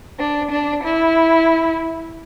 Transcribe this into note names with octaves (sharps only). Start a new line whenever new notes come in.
D4
D4
E4